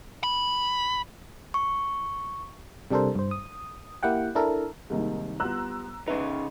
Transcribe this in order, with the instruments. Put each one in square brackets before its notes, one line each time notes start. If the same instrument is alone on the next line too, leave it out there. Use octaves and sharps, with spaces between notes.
[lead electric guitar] B5
[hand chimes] C#6
[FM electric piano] C3 G3 D4 A4 A#4 C5
G2 C5
D#6
A#3 E4 G4 F#5 G5
D4 E4 A4 A#4
[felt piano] C2 C3 D#3 [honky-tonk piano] G#3 A#3 D#4
[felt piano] G3 B3 F4 [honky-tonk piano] A#5 E6 F#6
[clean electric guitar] C#3 D#4 [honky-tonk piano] B4 [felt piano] E5